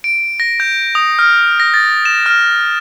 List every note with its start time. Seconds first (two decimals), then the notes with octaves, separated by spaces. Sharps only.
0.04 D7
0.40 A#6
0.60 G6
0.95 D#6
1.19 F6
1.60 A#6
1.74 A6
2.05 E7
2.26 F6